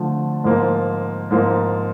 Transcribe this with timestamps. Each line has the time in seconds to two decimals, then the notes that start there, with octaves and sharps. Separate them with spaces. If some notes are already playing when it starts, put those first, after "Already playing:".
Already playing: D3 F3 A3
0.44 G#2 F3 A#3
1.31 G#2 F3 A#3